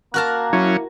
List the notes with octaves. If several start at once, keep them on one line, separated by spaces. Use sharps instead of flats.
A#3 F#4 A#4 A5 F6 F#6
F#3 C#4 E4